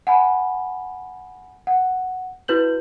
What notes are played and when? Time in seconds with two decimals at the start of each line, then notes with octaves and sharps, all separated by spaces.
0.07 F#5 G#5 B5
1.67 F#5
2.48 E4 F#4 B4 G6 F#7